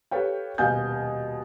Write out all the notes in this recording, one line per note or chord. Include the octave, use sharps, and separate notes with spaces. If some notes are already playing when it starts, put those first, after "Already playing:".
G4 A4 B4 C#5 F5 G5
D#1 B2 B3 F5 G#5 G6